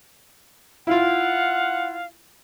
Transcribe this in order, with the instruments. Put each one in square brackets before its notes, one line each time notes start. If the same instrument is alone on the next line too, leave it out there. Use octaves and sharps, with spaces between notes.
[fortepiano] E4 F4 [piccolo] F5 [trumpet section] F#5